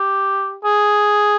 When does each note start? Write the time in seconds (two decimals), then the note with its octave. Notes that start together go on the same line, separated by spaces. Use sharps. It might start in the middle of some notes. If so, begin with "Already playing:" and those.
Already playing: G4
0.64 G#4